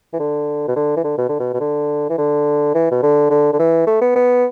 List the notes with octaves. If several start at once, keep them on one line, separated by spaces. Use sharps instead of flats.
E3
D3
B2
D3
E3
D3
B2
D3
B2
B2
D3
E3
D3
E3
B2
D3
D3
D3
E3
A3
B3
B3